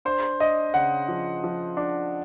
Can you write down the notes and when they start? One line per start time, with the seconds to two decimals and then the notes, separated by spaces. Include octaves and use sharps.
0.05 D4 C5
0.40 D4 D#5
0.74 C#3 F#5
1.08 F3
1.44 F3
1.77 D4